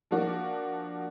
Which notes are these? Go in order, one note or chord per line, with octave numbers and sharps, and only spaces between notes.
F3 A#3 D4 F#4